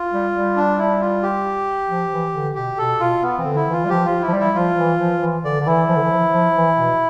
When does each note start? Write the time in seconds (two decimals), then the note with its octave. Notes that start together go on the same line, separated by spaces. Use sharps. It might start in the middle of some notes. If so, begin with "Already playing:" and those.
Already playing: F4
0.12 G3
0.34 G3
0.56 D4
0.78 E4
1.01 F4
1.23 G4
1.89 F3
2.11 E3
2.34 D3
2.55 B2 G4
2.78 B2 A4
3.00 B2 F4
3.22 B3
3.38 E3 C4
3.45 D3
3.56 E4
3.67 E3
3.72 F4
3.85 G3
3.89 F3 G4
4.05 F4
4.22 E4
4.28 F3
4.33 G3
4.39 E4
4.55 F3 F4
4.77 E3
4.99 F3
5.22 E3
5.43 D3 D5
5.60 D3
5.66 E3 E4
5.88 F3
5.96 D3
6.03 E3
6.10 F3
6.33 F3
6.55 E3
6.77 B2